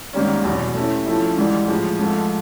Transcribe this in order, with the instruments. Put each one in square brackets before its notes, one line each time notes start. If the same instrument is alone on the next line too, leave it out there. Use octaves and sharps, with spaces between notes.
[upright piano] G#2 D#3 G3 A#3 C#4
E2 B2 F#3
A3 C#4 E4 G4
F3 A3 C#4 E4
G#2 E3 G3
A2 F3 G#3
G#2 F3 A3